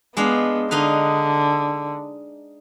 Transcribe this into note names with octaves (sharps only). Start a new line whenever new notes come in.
G#3 B3 D4 F5
D3 D#4 B4 F5